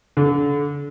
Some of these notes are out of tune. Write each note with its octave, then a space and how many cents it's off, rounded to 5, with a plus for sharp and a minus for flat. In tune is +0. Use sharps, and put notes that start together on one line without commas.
D3 -30